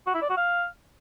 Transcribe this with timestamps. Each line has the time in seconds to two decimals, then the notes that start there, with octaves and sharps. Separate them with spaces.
0.07 F#4
0.14 E4
0.22 D5
0.29 F#4
0.37 F5